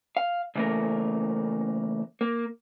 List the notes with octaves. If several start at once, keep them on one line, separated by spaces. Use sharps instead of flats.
F5
C#3 E3 A3 A#3 A#4
A#3